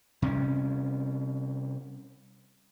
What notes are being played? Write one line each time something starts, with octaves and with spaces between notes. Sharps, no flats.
C3 G3 A3 C#4